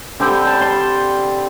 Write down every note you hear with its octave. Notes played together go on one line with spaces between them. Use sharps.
D3 G3 C4 G5 B5
A5
B5
A5 C6